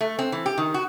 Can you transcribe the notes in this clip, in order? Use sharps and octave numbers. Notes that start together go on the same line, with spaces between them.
A3
C4
E3
G4
D#3
F#4